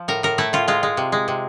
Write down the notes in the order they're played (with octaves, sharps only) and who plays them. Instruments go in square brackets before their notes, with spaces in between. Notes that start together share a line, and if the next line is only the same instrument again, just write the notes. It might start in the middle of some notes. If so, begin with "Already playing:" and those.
Already playing: [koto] F3
A2 A#4
A2 A#4
A3 E4
A2 F4
G#3 F4
G#3
C3
G#3
C3